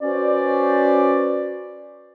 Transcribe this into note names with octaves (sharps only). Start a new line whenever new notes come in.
C#4 F#4 B4 C5 D5